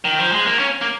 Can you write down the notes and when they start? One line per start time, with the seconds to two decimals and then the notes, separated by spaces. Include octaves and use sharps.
0.05 D#3
0.19 F3
0.32 G#3
0.46 A#3
0.59 C#4
0.81 A#3